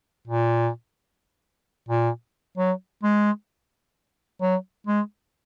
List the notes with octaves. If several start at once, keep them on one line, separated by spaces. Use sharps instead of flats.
A#2
A#2
F#3
G#3
F#3
G#3